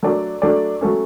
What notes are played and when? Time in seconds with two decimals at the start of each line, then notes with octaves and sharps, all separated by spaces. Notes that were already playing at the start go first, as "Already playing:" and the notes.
0.03 F#3 A3 D4 A4 D5
0.42 F#3 A3 D4 A4 D5
0.81 F#3 A3 C#4